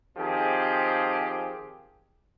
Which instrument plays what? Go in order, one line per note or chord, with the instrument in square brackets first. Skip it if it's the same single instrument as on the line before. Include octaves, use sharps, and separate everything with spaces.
[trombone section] D#3 F3 C4 G4 G#4